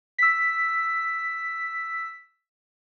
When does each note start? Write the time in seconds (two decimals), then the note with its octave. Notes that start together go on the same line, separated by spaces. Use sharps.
0.18 E6 B6